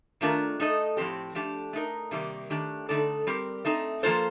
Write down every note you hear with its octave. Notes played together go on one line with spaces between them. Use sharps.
D#3 A3 D4 F4 A#4
A3 D#4 A4 D#5
A2 F3 C4 G4
F3 A3 D4 G4
A3 D#4 A#4
C3 D#3 G3 A#3
D#3 A3 D4 G4
D3 A3 D#4 A4 D5
G3 C4 G4 A#4
A3 C4 D#4
F3 A#3 F4 A4 C5